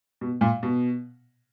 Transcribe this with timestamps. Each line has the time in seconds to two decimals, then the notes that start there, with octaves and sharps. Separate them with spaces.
0.21 B2
0.41 A#2
0.63 B2